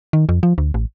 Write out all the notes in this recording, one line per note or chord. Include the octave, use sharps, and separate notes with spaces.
D#3
F2
F3
D2
A1